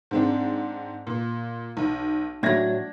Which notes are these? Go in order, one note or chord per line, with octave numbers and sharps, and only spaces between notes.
G#2 C4 D4
A#2
B1
A2 F#3 D4 G#6 A#6